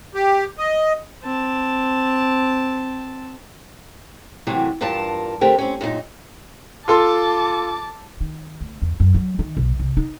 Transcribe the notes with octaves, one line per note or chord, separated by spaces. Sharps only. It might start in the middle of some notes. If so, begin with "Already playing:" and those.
G4
D#5
C4 A5
C3 E3 F#3 G3 A3 A#3
E2 G2 F4 A#4 A5
D3 A3 C4 G4 A#4
C4 C#4
F#2 A#2 D4 D#4
F4 A4 A5 C6 D6
D#3
D2
E2
F#2
F#3
D#3
B1
C2
D#4